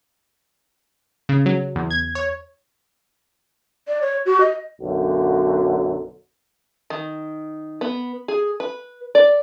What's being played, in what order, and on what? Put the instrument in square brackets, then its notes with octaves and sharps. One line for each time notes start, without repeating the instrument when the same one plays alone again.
[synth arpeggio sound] C#3
F#3
E2
G#6
C#5
[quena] D5
C#5
F#4
D#5
[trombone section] B1 F#2 D3 F#3
[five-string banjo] D#3
B3
G#4
B4
D5